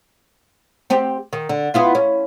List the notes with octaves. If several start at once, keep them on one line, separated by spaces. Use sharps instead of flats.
C4 G4
D#3
D3
B3 E4 F4
C#4